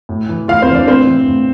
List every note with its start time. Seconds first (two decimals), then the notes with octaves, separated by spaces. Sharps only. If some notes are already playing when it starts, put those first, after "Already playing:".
0.09 A2
0.29 E3
0.48 A2 F4 F5
0.62 C4 C5
0.69 E3
0.74 D4 D5
0.88 A2 C4 C5
1.07 E3
1.28 A2